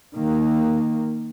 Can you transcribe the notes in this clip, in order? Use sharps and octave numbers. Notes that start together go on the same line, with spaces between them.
D#3 A#3